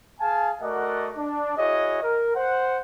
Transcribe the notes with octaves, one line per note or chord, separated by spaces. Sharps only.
G#4 F5 G#5 A5
A3 F#4 A#4 D5 D#5 F#5
D4
E4 F#4 G#4 C#5 D#5
A#4
C5 F#5